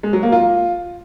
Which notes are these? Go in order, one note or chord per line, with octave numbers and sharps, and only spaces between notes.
G#3
F#3
A#3
F4